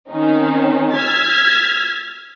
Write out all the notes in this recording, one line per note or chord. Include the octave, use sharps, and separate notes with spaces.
D#3 C4 C#4 D#4
E6 F6 G#6 A6 B6